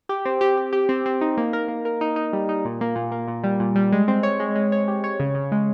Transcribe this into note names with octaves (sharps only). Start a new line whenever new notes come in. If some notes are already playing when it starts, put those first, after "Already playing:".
G4
C4
G4
G4
G4
C4
C4
D#4
A#3
A#4
A#3
A#4
D#4
D#4
G3
D#4
A#2
A#3
A#2
A#3
A#2
G3
A#2
G3
G#3
C4
C#5
G#3
G#3
C#5
G4
C#5
C#3
C#3
G#3